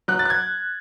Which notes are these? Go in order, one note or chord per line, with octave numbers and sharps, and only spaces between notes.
F#3 F#6
A6
F#6
G#6